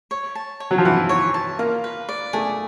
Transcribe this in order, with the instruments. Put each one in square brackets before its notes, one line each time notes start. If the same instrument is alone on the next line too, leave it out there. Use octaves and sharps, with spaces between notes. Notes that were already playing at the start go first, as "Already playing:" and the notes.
[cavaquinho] C#5
A5
C#5
[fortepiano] F#3
F3
[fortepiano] E3 [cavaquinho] F#5
[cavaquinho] C#5
A5
[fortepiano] A#3 [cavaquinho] F4
[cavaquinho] B4
D5
[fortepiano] A3 [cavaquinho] G#4